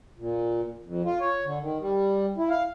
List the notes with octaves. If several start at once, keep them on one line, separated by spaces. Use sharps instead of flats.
A#2
F2
F4
C#5
D3
D#3
G3
E4
F5